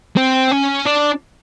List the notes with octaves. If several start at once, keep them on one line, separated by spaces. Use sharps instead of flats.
C4
C#4
D4